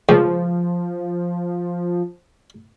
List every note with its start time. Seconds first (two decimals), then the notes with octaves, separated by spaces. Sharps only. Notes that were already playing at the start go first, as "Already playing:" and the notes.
0.09 C#2 F3